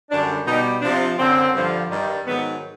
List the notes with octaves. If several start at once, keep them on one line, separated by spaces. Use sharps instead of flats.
F#2 D3 G3 D4
B2 G3 D#4
C3 F3 D4
F#2 D3 F#3 C4
G2 D3 F3
G2 D#3 G3
G#2 D#3 F#3 B3